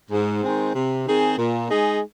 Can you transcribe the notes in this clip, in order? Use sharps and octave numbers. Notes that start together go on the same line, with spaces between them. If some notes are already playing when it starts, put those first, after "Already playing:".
G#2
D#3 G#3 C4
C3
D#3 C4 G#4
A#2
G#3 D#4 G#4